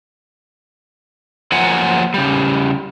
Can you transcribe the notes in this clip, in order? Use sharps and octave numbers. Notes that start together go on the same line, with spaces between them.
F3 F#3 A#3 F4 F#5 G#5
C#3 G3